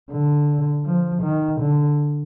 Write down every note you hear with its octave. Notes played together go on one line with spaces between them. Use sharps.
D3
F3
D#3
D3